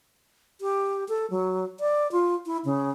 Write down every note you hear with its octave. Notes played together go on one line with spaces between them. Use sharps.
G4
A4
F#3
D5
F4
E4
C#3